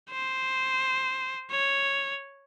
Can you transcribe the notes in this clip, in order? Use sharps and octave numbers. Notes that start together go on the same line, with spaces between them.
C5
C#5